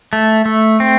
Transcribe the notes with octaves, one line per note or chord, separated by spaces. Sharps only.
A3
A3
C4